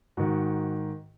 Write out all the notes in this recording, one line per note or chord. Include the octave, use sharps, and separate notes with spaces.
G#2 D#3 F#4